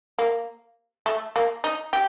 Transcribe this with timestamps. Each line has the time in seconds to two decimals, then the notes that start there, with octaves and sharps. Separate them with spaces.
0.19 A#3
1.06 A3
1.36 A#3
1.64 D#4
1.93 G4